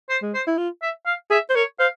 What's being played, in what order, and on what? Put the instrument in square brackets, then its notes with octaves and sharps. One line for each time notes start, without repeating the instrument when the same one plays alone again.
[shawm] C5
[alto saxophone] G#3
[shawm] C5
[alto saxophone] E4
F4
[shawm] E5
F5
[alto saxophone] G#4 [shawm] E5
[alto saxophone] C5
[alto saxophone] A#4 [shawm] C#5
[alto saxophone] C5 [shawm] F5